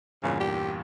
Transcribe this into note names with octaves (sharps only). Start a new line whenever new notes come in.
E2 G2 A#2 C#3
G4